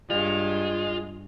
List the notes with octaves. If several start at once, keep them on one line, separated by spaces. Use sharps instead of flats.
G2 G#3 F4